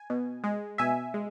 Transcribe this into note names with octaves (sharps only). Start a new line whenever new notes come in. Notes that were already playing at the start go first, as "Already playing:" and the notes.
Already playing: G#5
B2
G#3
B2 E5 G#5
G#3